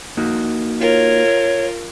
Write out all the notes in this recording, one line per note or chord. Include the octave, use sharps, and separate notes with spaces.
A#3 D#4 F#4
F4 A#4 C#5